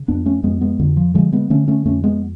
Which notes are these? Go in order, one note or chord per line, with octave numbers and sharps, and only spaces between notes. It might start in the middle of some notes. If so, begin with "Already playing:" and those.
Already playing: C#3
F2 B3 D4
A3 C#4
F2 G#3 B3
G#3 B3
F2 D3
F3
D3 F3 G#3
G#3 B3
D3 A3 C#4
A3 C#4
F2 A3 C#4
G#3 B3